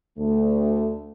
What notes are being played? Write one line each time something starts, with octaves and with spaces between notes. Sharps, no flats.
D2 A3